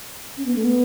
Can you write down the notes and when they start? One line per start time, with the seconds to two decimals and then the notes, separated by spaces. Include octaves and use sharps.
0.37 C#4
0.45 B3
0.56 A3
0.65 B3